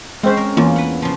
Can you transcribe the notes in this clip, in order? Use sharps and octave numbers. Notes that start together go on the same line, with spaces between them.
G#3 C4 C#4 C5
A#4
E2 A#3 C#4 F4
B4 F#5
C#3 F3